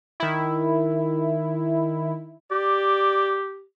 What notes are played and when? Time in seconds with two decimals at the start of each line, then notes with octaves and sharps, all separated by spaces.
0.20 D#3 E4
2.51 G4 D5